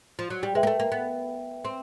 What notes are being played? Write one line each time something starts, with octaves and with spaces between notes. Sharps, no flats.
F3
F#3
G3
G#3 B4 E5 G5
A#3
A3
A#3
B3
C4